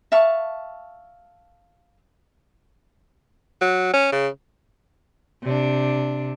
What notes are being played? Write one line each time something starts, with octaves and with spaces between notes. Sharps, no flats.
E5 F5 A5 C#6
F#3
C#4
C#3
C3 D4